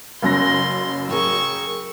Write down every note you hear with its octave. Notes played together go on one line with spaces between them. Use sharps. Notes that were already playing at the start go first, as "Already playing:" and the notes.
F#1 F#2 C6 A#6
G#4 A#4 G5 C#6 E6